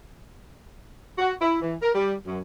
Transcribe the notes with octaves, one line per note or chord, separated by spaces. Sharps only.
F#4
E4
E3
A#4
G3
F#2